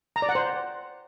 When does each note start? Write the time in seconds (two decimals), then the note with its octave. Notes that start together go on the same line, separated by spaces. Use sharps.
0.16 A#5
0.22 D5
0.29 F#5
0.35 C5